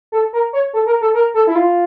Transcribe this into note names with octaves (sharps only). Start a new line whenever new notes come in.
A4
A#4
C#5
A4
A#4
A4
A#4
A4
E4
F4